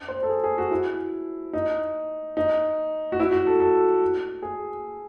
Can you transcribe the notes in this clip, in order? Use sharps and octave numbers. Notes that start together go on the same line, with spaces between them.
C5
A4
G#4
G#4
F#4
E4
D#4
D#4
F#4
E4
F#4
A4
A4
G#4